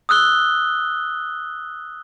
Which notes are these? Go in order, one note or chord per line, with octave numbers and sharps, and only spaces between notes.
D#6 E6 F#6 G7